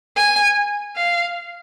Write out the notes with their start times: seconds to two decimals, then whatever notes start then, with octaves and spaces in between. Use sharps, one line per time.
0.16 G#5
0.96 F5